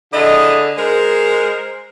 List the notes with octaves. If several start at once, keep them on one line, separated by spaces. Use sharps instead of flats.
D3 E4 G#4 D#5
G#3 A#4 C5